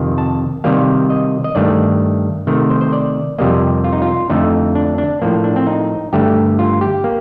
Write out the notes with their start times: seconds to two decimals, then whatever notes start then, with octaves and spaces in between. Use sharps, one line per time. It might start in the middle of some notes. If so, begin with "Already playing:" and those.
Already playing: F2 C3 D#3
0.18 A5
0.64 C3 D#3 G3 A#3 F5
1.10 D#5
1.44 D#5
1.55 G2 D#3 A3 D5
2.47 C3 D#3 A3
2.70 C5
2.81 C5
2.93 D5
3.38 F2 C3 G3 A#3 D#5
3.84 F4
3.93 D#4
4.02 F4
4.30 F2 D3 F3 A3 D#4
4.75 D4
4.98 D4
5.22 A2 F3 A#3
5.44 D4
5.56 C4
5.67 D#4
6.13 G2 D3 A3 G4
6.59 F4
6.81 G4
7.04 A#3